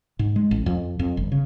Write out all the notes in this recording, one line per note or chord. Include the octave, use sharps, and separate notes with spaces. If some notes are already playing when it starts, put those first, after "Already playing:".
G#2
G#3
A1
F2
F2
G1
C#3